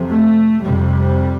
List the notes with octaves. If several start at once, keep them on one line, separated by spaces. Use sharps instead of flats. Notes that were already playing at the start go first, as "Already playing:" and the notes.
Already playing: F2 C3
A3
F2 C3 G3